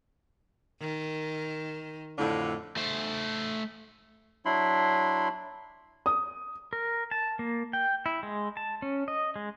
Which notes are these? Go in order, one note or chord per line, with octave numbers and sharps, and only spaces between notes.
D#3
F2 A2 D3
A3 C5
F#3 D4 E4 B5 C6
D#6
A#4
A5
A#3
G5
E4
G#3
A5
C#4
D#5
G#3